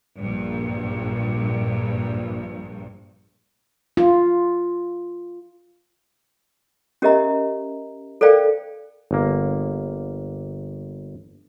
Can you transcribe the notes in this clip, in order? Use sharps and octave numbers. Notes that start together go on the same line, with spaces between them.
A#1 G2
F4
C#4 G4 A#4 D#5 E5 A#5
A4 A#4 C5 D5 F5 G5
G1 A#3